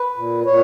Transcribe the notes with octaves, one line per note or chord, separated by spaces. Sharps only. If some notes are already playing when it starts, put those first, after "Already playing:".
Already playing: B4
A#2
A#2 C#5